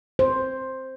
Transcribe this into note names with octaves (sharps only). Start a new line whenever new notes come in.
C5